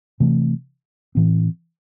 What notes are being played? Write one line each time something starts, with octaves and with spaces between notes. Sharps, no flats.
C3 E3 A3
A2 E3 C4